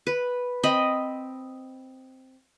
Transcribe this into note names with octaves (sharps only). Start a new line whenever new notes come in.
B4
C4 D#5 B5